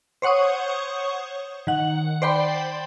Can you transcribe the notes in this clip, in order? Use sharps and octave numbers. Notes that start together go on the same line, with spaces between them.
C5 C#5 F#5 C#6 D#6
D#3 F#5
C5 D5 G5 B5 C6